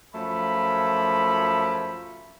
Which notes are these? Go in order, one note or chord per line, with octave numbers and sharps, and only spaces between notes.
F#2 F3 A3 B5